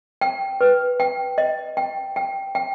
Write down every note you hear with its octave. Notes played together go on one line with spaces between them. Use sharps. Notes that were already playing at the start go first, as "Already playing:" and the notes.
G5
B4
G5
D#5
G5
G5
G5